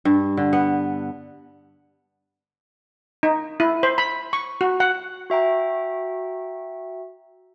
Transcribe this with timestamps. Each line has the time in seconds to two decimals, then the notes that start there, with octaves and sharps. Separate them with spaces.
0.05 G2
0.37 D3
0.53 B3
3.23 D#4
3.60 E4
3.83 C5
3.98 B5
4.33 C#6
4.61 F#4
4.80 F#5
5.30 F#4 E5 G5 A#5